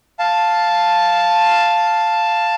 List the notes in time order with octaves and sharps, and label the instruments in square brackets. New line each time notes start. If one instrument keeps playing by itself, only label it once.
[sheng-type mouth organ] F5 A5